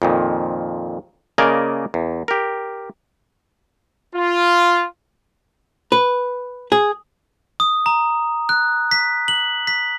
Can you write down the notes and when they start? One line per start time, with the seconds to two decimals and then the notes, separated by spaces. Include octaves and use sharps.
0.02 F2 A#2 D#3
1.38 C#3 A#3 A#4 D5 D#5 G#5
1.94 E2
2.28 G4 A#4
4.14 F4
5.92 B4
6.72 G#4
7.60 D#6
7.86 A#5
8.49 F#6
8.91 B6
9.28 F#7
9.67 B6